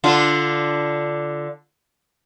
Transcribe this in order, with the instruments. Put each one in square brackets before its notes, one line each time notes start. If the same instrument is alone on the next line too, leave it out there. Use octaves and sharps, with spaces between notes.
[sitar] D3 D4 F4